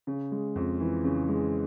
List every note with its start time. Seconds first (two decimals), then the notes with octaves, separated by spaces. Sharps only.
0.07 C#3
0.32 G#3
0.56 F2
0.80 E3
1.04 C#3
1.28 G#3